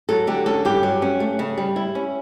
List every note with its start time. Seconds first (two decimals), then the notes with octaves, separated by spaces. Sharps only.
0.09 F#3 A4
0.27 D3 G4
0.46 C#4 A4
0.65 G2 G4
0.83 F#3
1.02 C#4
1.20 A3
1.39 C#3
1.58 G3
1.76 E4
1.95 C#4